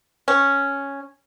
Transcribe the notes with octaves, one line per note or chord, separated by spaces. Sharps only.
C#4